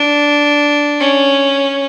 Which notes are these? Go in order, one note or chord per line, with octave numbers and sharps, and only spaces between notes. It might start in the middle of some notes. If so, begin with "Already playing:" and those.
Already playing: D4
C#4